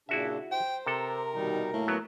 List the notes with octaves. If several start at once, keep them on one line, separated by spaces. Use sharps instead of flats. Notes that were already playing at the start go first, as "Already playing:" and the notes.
A#2 C#3 D4 E4 F#4 E5
C5 G5
C3 A4 A#4
B2 D#3 G3 D#4
A2 A#3
F#3 B3